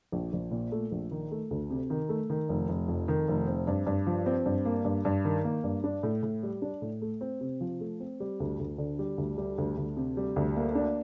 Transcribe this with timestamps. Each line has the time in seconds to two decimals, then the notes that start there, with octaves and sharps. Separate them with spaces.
0.12 A#1
0.33 A#1
0.51 A#2
0.72 A3
0.92 A#1
1.11 D#3
1.31 A3
1.51 D2
1.70 C3
1.90 D#3
2.09 A3
2.30 D#3
2.49 F1
2.69 F1
2.88 F2
3.08 D#3
3.28 F1
3.47 C4
3.67 G2
3.87 G2
4.07 F3
4.26 C4
4.46 G2
4.65 A#3
4.85 G2
5.05 G2
5.25 D#3
5.44 A#3
5.64 G2
5.84 D4
6.03 A2
6.23 A2
6.43 G3
6.62 D4
6.82 A2
7.02 A3
7.21 C4
7.41 C3
7.61 F3
7.81 A3
8.00 C4
8.20 G3
8.40 D2
8.59 D2
8.78 D3
8.99 G3
9.18 D2
9.38 G3
9.58 D2
9.77 D2
9.97 C3
10.17 G3
10.36 D2
10.56 A#3
10.75 D4